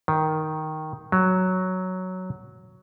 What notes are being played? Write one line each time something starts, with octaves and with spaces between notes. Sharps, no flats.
D#3
F#3